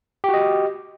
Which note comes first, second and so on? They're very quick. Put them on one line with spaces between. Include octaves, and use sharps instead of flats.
G4 F#4 D#5